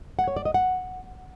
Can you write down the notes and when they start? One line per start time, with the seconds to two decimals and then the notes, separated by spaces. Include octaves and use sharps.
0.19 F#5
0.28 C#5
0.37 D5
0.45 D#5
0.54 F#5